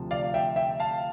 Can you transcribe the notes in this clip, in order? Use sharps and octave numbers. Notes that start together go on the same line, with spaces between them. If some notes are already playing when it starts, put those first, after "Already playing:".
Already playing: D2 C3 F3
D5 F5
E5 G5
E5 G5
F5 A5